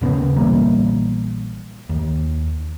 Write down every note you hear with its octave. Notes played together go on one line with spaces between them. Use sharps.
D#2 C#3 A#3 B3
A#1 E3 G3 A#3
D#2